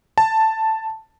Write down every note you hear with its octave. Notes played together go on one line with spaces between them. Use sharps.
A5